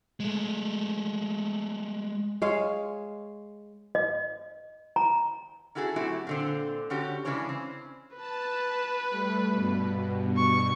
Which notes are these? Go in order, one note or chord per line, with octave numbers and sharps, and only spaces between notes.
G#3 A3
G#3 C#5 F5
D#5
A#5
C#4 E4 F#4 G#4 A4
F#3 A3 C4 E4 F#4 G4
A#2 D3 C4
D3 C#4 F#4 G4
C#3 E3 G#3 C#4 D4 C#5
C4 C#4
B4 A5
G3 A3
G2 B2
C#6